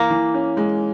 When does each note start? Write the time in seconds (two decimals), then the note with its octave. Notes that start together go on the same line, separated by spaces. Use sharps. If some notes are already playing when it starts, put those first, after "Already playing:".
Already playing: E3 A#3
0.10 E3
0.34 C#4
0.57 G#3